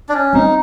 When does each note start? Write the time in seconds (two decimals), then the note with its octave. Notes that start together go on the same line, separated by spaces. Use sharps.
0.09 D4
0.14 C#4
0.33 G3 C4 D#4